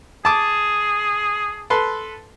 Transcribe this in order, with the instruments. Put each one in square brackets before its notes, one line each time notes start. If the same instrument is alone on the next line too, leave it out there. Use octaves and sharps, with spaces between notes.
[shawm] G#4 [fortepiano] A5 D6
[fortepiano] A4 B4 C6